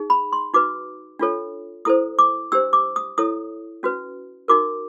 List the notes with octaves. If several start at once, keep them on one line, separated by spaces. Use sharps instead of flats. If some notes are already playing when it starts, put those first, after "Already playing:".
Already playing: D#4 G#4
B5
C6
D#4 F#4 B4 D6
D4 F4 A4 C#5
E4 A4 C5 D#6
D6
D4 G4 C5 E6
D6
D#6
E4 A4 C#5 D#6
C#4 F#4 B4
D#4 F#4 A#4 D6